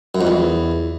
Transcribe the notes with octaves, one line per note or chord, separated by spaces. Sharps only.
F#2
F2
E2